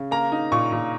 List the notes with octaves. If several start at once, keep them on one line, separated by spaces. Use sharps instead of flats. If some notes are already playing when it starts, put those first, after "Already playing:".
Already playing: C#3
A#3 A#5
D#4
A#2 C#6
A#2